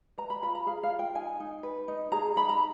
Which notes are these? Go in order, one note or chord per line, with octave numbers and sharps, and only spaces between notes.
B4 A#5
B5
F4 B5
A#5
G#4 F5
F5
F4
G5
D#4 G#5
D#4
B4
D#4
G#4 A#5
D#4 B5
A#5